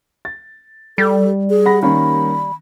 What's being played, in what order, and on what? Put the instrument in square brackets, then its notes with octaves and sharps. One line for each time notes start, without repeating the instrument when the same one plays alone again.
[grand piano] A6
[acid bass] G3 [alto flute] A4
[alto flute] G#4
[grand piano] F#5 B5 A#6
[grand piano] D#3 A#3 C#4 [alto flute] B5